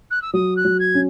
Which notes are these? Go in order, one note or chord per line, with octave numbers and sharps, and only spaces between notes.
F#6
E6
F#3 D#6
F#6
F#3
G#6
C#4